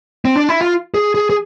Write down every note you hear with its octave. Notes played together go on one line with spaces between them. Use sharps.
C4
D4
E4
F4
G#4
G#4
G#4